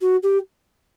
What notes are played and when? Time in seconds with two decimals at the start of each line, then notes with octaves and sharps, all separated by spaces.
0.01 F#4
0.23 G4